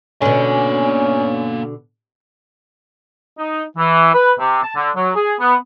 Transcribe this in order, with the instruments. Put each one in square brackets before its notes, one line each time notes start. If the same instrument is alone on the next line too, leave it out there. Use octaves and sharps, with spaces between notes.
[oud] B2 D3 [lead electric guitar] A#3 G#5 [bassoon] C#4
[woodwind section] D#4
E3
B4
C3
A5
D3
F#3
G#4
B3